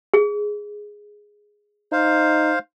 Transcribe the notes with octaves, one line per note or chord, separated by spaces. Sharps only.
G#4
D#4 C5 F5